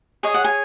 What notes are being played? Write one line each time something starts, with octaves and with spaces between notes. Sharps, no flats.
G#4 C#5 D#5
F#5
G#5